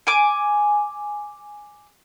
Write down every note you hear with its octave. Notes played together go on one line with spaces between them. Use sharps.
G#5 D6